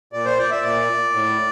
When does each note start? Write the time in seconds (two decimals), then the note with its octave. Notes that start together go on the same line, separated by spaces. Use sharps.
0.13 A#2 D5
0.25 C5
0.38 D5
0.51 E5
0.63 A#2 D5
1.13 A2